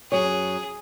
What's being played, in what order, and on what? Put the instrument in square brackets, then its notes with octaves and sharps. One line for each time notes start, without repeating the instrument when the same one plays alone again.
[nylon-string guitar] F#2 F#3 C#5 [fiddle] G#4